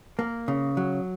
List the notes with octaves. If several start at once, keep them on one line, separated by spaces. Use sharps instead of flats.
A#3
C#3
F#3